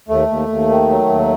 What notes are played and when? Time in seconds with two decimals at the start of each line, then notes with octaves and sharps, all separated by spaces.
0.08 D#2 A3
0.28 D#2
0.48 D#2
0.69 D#3
0.89 F#3
1.08 D#2